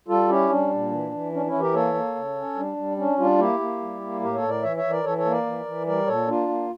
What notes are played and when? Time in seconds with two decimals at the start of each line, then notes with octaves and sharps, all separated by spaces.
0.08 G3 F4 A4
0.29 C#4 E4 G4
0.49 G3 D4
0.71 A#2
0.91 E3
1.12 E3
1.32 C#4 D4
1.46 C#4 E4
1.53 E3
1.60 G4 A#4
1.74 A#3 A4 C#5
1.94 A#3
2.15 C#3
2.36 C#4
2.56 G3 D4
2.76 G3
2.97 C#4 D4
3.18 G3 D4 F4
3.38 A#3 E4 G4
3.59 A#3
3.80 G3
4.01 A#3
4.21 A2 G4 A#4
4.35 A4 C#5
4.42 A2
4.49 A#4 D5
4.63 E3 C#5 E5
4.77 C#5 E5
4.84 E3
4.90 A#4 D5
5.04 E3 A4 C#5
5.18 A4 C#5
5.25 A#3
5.32 A#4 D5
5.46 E3
5.65 E3
5.87 G3 A#4 D5
6.07 A#2 A4 C#5
6.28 A#3 D4 F4
6.49 A#3